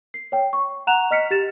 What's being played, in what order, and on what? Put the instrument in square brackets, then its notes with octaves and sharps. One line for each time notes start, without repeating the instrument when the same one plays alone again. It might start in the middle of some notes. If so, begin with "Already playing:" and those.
[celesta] C7
C#5 G5
C#6
F#5 A#5 F#6 E7 F7
D#5 F6 B6 C#7
G4 A6 E7